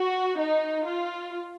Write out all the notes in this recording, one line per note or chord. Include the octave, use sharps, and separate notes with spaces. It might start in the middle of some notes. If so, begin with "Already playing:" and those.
Already playing: F#4
D#4
F4